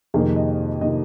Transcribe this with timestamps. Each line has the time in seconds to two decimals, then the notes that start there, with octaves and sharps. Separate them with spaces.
0.14 F2 C3 D#3 A#3 G#4
0.36 D#5
0.81 C3 D#3 A#3 D#5